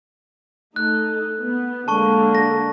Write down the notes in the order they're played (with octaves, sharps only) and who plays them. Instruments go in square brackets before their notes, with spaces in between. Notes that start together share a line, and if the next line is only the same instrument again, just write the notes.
[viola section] A3 D#4 A4 [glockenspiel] F#6
[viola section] B3
[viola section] D3 G#3 A#3 [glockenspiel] A5 C#6
[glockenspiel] A#6